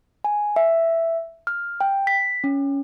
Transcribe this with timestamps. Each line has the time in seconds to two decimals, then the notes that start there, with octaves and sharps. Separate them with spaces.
0.24 G#5
0.56 E5
1.47 F6
1.81 G5
2.07 B6
2.44 C#4